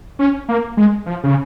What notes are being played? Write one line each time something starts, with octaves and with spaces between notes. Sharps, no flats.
C#4
A#3
G#3
F3
C#3